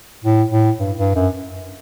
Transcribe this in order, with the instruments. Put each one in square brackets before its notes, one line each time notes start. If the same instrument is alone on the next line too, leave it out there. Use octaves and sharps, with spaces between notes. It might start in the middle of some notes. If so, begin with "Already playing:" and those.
[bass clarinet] A2
A2
G2
G2
F#2